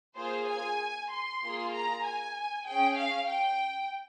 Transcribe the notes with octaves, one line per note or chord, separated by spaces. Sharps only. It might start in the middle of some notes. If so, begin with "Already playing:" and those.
A#3 F4 G#4 C5
G#5
C6
A#3 F4 G#4
A#5
G#5
G#4 G5
C#4
F5
G5